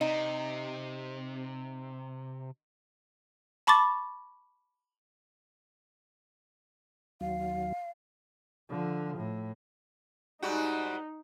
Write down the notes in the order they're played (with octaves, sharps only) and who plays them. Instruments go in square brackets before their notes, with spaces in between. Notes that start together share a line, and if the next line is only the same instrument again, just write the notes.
[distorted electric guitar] C3 [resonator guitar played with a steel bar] D#4
[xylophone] A5 B5 C#6 D6 A6
[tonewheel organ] D#2 F#3 [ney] F5
[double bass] D3 F3
A2
[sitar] G#2 G3 F#4 [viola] D#4